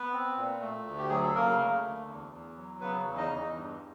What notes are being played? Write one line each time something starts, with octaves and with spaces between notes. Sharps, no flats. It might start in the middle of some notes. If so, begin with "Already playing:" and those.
Already playing: B3 B4
C4
A#2
A3
D2
G4
F#3 G#4
A4
C#3 A#3 A#4
A3
D2
E2
E2
F#3
C#3 B3 B4
E2
D#4 D#5
E2
G2